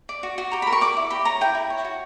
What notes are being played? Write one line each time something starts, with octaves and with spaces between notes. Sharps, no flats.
D5
F#4
F#4
G4 A#5
A#4 B5
C#6
D5 D6
E4
G4 B5
C#5 A#5
E4 G5
E4
C#5
F#4